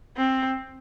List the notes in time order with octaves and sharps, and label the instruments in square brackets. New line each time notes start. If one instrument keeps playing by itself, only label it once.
[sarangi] C4